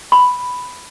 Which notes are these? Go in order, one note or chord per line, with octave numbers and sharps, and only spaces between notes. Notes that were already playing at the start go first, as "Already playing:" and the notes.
B5